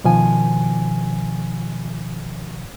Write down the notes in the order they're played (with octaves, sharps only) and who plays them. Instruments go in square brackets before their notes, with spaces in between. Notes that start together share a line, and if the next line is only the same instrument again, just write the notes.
[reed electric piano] B2 D#3 F3 G#5